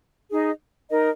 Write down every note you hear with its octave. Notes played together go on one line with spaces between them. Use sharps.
D#4 G#4 D#5
D#4 A#4 D#5